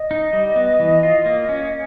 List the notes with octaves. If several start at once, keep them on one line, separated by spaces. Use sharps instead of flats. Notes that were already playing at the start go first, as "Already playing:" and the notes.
Already playing: D#5
D#4
G3
B3
E3
F4
A#3
C#4